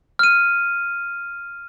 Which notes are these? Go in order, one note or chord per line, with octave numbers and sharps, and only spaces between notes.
F6 D#7